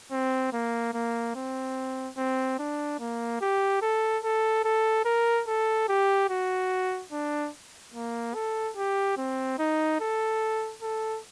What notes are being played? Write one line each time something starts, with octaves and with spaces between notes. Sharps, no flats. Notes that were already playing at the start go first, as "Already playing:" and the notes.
C4
A#3
A#3
C4
C4
D4
A#3
G4
A4
A4
A4
A#4
A4
G4
F#4
D4
A#3
A4
G4
C4
D#4
A4
A4